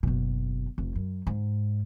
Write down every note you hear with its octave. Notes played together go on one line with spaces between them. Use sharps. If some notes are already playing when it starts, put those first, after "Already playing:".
F#1 B2
F1
F#2
G#2